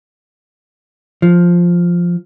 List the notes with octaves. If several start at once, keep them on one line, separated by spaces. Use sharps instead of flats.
F3